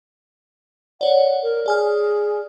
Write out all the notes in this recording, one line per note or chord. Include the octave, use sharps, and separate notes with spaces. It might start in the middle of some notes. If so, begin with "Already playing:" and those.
C#5 D5 F#5
A#4
G#4 D5 G#5 F6